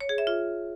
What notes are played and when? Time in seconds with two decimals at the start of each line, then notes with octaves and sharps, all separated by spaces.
0.01 C#5
0.09 G#4
0.18 E5
0.27 F4